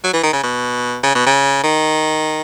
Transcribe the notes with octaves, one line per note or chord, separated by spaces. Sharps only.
F#3
E3
D#3
C#3
B2
C#3
B2
C#3
D#3